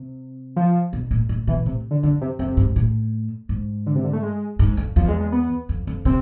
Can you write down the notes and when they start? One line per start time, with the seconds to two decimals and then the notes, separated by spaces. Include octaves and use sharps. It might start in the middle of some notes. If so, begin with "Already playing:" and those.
Already playing: C3
0.56 F3
0.93 B2
1.11 A2
1.29 A2
1.47 B2 E3
1.66 A2 C3
1.91 D3
2.03 F2 D3
2.21 C3
2.39 F2 C3
2.57 G#2
2.76 A2
3.49 G#2
3.86 D3
3.95 C3
4.04 D3
4.13 A3
4.23 G#3
4.59 G#2
4.77 F2
4.96 E2 F3
5.08 G#3
5.20 G#3
5.32 B3
5.69 F2
5.87 F2
6.05 C3 C4